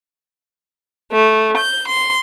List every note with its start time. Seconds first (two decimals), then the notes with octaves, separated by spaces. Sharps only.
1.11 A3
1.57 G6
1.88 C6